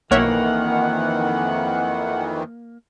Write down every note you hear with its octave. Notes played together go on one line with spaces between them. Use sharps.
B1 F2 D#3 E3 A#3 C#5 E5 F#5